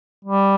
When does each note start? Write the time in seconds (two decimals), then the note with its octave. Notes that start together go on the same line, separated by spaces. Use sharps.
0.25 G3